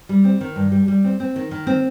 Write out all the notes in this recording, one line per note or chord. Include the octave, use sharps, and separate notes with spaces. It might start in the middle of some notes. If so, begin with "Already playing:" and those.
G3
C4
D#3
G2
G3
G3
C4
C4
D#3
D#3
C4